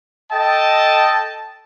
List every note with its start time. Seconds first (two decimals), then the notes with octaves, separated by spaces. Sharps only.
0.32 A4 D#5 G5 A5